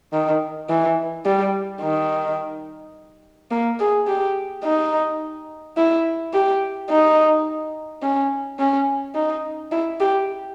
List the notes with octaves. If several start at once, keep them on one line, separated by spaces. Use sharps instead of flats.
D#3
E3
G3
D#3
A#3
G#4
G4
D#4
E4
G4
D#4
C#4
C#4
D#4
E4
G4